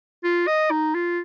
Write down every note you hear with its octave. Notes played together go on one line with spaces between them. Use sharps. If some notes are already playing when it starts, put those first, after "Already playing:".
F4
D#5
D#4
F4